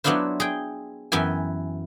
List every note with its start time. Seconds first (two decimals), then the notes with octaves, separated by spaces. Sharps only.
0.04 F#3 B3 D4 E4 F4 C5
0.40 G#4 G5
1.12 F#2 E3 B3 G5 G#5